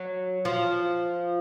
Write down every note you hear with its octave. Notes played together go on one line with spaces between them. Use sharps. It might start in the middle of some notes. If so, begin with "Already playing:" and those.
Already playing: F#3
F3